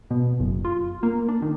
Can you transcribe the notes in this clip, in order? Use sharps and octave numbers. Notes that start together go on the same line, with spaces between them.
B2
F#1
F4
A#3
D4
D#3